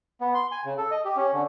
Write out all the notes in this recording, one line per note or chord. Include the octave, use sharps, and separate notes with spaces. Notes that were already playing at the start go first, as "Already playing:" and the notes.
B3
C6
G#5
C#3
A4
D#5
G4
C#4
D3